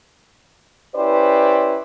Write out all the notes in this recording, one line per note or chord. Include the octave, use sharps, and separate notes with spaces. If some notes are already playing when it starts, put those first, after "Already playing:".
C#4 E4 G4 B4 C5 D5